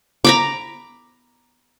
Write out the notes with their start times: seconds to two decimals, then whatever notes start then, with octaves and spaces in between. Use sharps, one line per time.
0.24 A#5 B5 D6